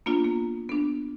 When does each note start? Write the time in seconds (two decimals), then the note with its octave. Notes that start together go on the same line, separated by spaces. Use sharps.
0.06 A#3 B3 D4 F4
0.24 A#3
0.69 B3 D4